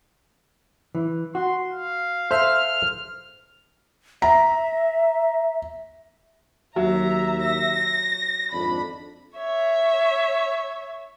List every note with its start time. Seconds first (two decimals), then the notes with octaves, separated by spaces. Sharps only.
0.95 E3
1.35 F#4 C6
1.70 F5
2.31 A4 C5 E5 F6
4.22 E5 A#5
6.76 D#2 F#3 E5 A#5
7.43 A#6
8.52 G#1 F2 D4 B5
9.36 C#5 E5